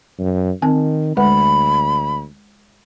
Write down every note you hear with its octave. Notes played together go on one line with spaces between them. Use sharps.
F#2
D#3 C4 G#5 A5
D2 G#3 B4 F#5 B5